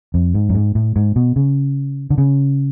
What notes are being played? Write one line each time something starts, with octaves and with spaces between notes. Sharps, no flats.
F2
G#2
F#2
G#2
A2
G#2
B2
C#3
D3
C#3